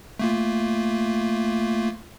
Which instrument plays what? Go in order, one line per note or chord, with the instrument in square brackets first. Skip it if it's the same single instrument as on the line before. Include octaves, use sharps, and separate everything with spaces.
[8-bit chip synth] A3 A#3 F4